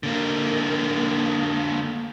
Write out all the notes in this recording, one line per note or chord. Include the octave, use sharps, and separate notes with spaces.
D3 A#3